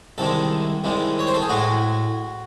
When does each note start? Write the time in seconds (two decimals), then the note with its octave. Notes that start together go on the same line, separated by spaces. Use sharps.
0.18 C2 C3 D#3 G#3 A4
0.84 C2 C3 D#3 G#3
1.19 C#5
1.27 C5
1.34 A4
1.42 G#4
1.49 A2 G#3 F#4